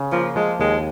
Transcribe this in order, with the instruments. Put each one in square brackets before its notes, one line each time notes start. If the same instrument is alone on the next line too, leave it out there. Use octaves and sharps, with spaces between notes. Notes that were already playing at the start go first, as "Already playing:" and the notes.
Already playing: [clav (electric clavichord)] C#3
[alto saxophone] F3 [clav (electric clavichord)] A#3
[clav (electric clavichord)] F3 [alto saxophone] G#3
[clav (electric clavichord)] D#2 [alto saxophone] G#3